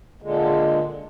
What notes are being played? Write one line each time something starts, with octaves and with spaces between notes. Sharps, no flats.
A#2 D3 G#3